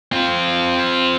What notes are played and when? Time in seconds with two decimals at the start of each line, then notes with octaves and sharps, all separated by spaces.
0.12 C4 F4